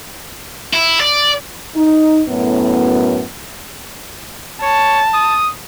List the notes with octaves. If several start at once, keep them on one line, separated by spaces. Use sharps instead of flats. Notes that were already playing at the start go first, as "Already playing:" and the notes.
E4
D5
D#4
F#2 A2 B3
C#5 A5
D#6